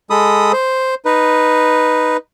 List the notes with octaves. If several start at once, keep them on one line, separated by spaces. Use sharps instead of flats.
G#3 A4 B5 D#6
C5
D#4 B4